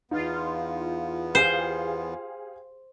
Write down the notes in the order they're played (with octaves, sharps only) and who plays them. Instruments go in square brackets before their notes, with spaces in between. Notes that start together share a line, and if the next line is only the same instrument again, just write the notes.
[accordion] E2 B3 [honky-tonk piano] D#4 [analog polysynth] F4
[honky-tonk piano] G4 G#4 F5 [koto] C5